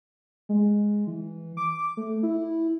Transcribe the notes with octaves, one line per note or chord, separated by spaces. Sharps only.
G#3
E3
D6
A3
E4